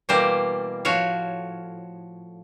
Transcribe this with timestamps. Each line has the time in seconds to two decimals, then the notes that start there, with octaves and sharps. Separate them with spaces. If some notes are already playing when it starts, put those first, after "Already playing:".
0.09 B2 E3 G3 A#3 C4 C5
0.85 A2 F3 F#4 C#5 F5